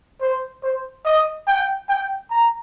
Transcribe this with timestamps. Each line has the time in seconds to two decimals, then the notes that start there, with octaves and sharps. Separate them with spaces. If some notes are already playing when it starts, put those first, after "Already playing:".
0.21 C5
0.63 C5
1.05 D#5
1.47 G5
1.89 G5
2.31 A#5